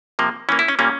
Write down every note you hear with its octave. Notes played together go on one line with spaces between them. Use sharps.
C3 F3 A#3
E3 A#3 C#4
E4
C#4
A#2 G3 A#3 C#4